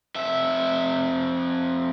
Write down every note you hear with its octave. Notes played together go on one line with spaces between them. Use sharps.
F2 E5